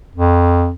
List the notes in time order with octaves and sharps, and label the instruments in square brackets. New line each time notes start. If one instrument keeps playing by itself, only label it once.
[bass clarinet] F2